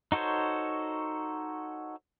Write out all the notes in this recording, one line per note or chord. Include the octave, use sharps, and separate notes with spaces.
D#4 F#4 A4 C5 C#5